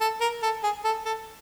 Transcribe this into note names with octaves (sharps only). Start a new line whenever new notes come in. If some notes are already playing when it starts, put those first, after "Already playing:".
A4
A#4
A4
G#4
A4
A4